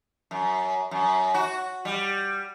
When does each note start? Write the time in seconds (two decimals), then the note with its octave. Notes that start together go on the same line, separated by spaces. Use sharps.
0.31 F#2
0.91 F#2
1.34 F#4
1.85 G3